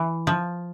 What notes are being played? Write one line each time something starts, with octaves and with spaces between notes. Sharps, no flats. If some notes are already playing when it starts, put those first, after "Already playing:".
Already playing: E3
F3